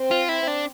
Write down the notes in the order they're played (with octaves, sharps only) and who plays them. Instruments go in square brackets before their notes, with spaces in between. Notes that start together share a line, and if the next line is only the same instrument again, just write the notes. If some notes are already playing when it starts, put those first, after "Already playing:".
Already playing: [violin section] C4 C5
[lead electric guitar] F4
E4
D4